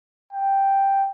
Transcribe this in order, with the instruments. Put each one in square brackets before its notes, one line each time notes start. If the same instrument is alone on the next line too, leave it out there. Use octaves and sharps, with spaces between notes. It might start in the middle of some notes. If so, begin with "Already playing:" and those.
[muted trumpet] G5